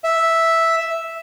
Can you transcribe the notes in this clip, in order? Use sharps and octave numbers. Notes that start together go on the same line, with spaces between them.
E5